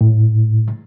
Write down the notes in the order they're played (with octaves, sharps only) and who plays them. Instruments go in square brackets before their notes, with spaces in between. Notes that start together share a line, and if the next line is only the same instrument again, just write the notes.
[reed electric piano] A2